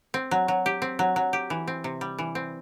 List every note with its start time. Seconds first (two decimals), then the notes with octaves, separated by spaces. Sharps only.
0.14 C4
0.31 F#3
0.48 F#3
0.66 G4
0.82 C4
0.99 F#3
1.16 F#3
1.33 G4
1.50 E3
1.68 C4
1.84 C3
2.01 G3
2.18 E3
2.35 C4